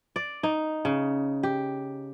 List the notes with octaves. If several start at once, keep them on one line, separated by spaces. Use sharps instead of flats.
D5
D#4
C#3
G4